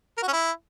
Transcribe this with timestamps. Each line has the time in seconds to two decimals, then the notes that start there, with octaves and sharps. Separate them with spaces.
0.17 A#4
0.23 F#4
0.28 C#4
0.33 E4